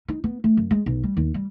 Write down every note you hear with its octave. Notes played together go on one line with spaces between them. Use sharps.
D#4
B3
A3
F#2
G#3
B1
G3
D#2
G3